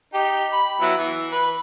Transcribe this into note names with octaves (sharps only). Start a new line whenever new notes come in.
D#4 G4
B5
F#3 B3 E4
E3
B4